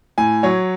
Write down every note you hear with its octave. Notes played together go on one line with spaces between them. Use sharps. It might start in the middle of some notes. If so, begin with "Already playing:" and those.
A2 G#5
F#3 C#5